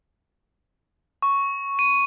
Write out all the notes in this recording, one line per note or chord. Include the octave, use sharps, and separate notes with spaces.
C#6
D#7